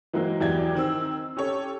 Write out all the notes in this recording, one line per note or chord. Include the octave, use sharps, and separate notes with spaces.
E3 F#3 G#3 A#3 C4 E4
E2 E3 F#3 G4 D5 G#6
D#3 C4 E6
C#4 G4 A4 C#5